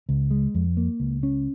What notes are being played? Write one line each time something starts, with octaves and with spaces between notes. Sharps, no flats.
C#2
G#3
F2
A#3
C#2
C#4